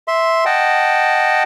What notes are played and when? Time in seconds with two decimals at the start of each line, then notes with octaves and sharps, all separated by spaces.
0.08 E5 C6
0.46 D#5 F#5 G5 A5